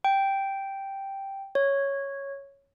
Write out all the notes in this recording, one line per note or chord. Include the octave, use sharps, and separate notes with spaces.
G5
C#5